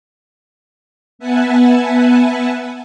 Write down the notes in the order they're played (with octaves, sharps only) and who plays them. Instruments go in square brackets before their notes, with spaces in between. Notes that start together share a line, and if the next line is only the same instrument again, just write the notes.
[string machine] B3 B4 E5 F#5 G#5 A5